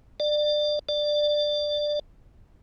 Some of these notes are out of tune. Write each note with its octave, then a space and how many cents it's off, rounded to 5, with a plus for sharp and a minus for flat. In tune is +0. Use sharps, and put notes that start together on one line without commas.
D5 +25
D5 +15